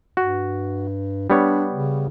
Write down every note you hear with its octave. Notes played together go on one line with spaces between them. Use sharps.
G2 F#4
G3 B3 D4 C#5
C#3